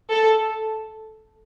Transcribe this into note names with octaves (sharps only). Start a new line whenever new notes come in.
A4